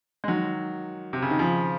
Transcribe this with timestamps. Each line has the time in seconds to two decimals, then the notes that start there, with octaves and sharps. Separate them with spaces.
0.24 G#3
0.28 D#3 F#3
1.13 C3
1.22 C#3
1.30 D#3
1.39 C#3 F3